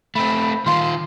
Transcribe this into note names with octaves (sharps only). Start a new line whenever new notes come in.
A3 C4 B5
D#3 F4 C6